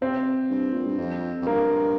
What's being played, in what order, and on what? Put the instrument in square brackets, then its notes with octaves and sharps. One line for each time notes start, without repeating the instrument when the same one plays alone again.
[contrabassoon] C3 [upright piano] C4
[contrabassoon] G2
A#2
G2
F2
F2
[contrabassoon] G2 [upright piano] A#3